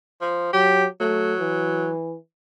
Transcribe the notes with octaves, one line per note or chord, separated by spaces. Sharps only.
F3
F#3 G4
F#3 A3
E3